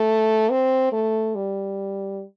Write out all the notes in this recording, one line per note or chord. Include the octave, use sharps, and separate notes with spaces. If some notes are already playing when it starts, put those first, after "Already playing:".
Already playing: A3
C4
A3
G3